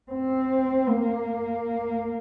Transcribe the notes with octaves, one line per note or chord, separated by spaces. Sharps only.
C4
A#3